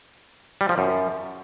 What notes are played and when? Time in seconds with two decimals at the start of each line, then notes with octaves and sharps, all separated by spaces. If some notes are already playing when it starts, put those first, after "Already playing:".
0.61 G3
0.69 F3
0.78 F#2